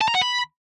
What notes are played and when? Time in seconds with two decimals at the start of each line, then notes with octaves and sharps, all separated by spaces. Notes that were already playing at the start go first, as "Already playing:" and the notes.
0.01 A5
0.08 A#5
0.15 F#5
0.21 B5